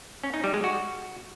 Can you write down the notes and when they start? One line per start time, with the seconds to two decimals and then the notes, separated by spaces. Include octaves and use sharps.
0.24 C#4
0.34 D#4
0.44 G3
0.54 G#3
0.64 F#4